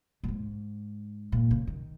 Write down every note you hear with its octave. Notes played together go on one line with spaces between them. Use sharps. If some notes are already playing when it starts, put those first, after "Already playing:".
A#2
G#2
A#2
C#3
D#3